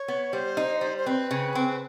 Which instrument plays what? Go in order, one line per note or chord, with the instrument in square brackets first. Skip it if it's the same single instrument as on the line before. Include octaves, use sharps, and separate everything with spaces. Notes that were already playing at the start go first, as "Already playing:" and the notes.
Already playing: [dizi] C#5
[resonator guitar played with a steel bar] B3
[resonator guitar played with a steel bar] G3 [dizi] C5
[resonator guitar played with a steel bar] D#4
G3
[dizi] C5
[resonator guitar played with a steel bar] C4 [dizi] B4
[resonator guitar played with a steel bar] C#3
C4